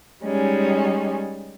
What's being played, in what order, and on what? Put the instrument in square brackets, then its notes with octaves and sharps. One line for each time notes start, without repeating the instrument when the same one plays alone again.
[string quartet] G3 G#3 C#4 D#4